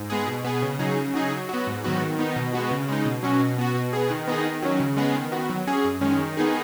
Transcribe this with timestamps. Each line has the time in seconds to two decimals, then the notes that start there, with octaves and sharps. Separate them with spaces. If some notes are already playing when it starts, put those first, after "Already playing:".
Already playing: G#2
0.10 G#3 B3 G#4
0.27 B2
0.45 B3 G#4
0.62 C#3
0.79 F#3 D#4 G#4
0.97 C#3
1.14 F#3 D#4 G#4
1.31 F#3
1.49 B3 F#4
1.67 G#2
1.84 D#3 F#3 B3 F#4
2.01 D#3
2.19 B3 D#4
2.36 B2
2.53 G#3 B3 F#4
2.71 C#3
2.88 G#3 D#4
3.05 B2
3.23 F#3 C#4 F#4
3.40 B2
3.58 B3 F#4
3.75 B2
3.93 B3 G#4
4.10 D#3
4.28 B3 D#4 G#4
4.45 D#3
4.62 F#3 C#4
4.80 C#3
4.97 G#3 B3 G#4
5.15 D#3
5.32 B3 F#4
5.50 F#3
5.67 C#4 G#4
5.84 F#2
6.01 D#3 G#3 C#4
6.19 D#3
6.37 B3 D#4 G#4